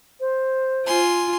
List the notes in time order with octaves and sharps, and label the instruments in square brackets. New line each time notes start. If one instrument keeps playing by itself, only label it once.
[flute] C5
[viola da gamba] F4 [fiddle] G#5 C6